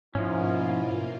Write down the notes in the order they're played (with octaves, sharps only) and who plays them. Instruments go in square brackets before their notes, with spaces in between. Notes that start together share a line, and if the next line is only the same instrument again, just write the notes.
[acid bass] G#2 [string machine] B2 A#3 F4 [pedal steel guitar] F3 C#4 [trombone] E4